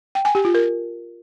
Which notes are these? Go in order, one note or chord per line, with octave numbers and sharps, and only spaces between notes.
G5
G#5
G4
F4
A#4